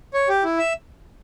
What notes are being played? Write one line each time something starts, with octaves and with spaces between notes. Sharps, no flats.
C#5
G4
E4
E5